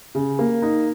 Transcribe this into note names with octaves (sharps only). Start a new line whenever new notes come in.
C#3
A#3
D#4